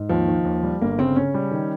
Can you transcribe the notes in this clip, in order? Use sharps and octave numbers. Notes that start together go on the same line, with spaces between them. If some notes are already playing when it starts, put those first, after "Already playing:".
Already playing: G#2
D#2 F3
D#3
D#2
G3
G1 A#3
C#3 C4
C#3 C#4
G3
D#3